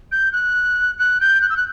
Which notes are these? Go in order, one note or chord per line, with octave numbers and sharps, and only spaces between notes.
G6
F#6
F#6
G6
F#6
E6
F#6